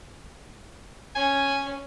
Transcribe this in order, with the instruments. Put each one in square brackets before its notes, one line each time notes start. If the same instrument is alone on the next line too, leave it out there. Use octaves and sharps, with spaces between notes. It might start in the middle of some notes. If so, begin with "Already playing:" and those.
[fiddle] C#4 [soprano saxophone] G#5